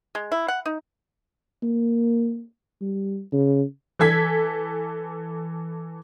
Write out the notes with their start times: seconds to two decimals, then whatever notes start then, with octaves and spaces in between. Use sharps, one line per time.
0.15 G#3
0.32 E4
0.48 F#5
0.66 D#4
1.63 A#3
2.81 G3
3.33 C#3
3.99 E3 A4 G#6 B6